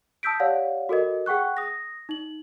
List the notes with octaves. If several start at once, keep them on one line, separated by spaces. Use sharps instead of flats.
A5 D#6 E6 G6 B6 D7
G4 C#5 D5 F5 F#5
F#4 A4 A#4 D#5
G#4 F#5 G5 C#6 F#6
D#6 A#6
D#4 F#7